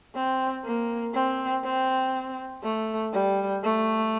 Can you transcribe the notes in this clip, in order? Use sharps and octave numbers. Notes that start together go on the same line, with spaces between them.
C4
A#3
C4
C4
A3
G3
A3